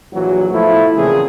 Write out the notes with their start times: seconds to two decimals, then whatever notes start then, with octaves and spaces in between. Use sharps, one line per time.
0.14 A#1 E3 F#3 F#4
0.51 B2 F3 A3 E4
0.96 A#2 C#3 E3 F3 C4 G#4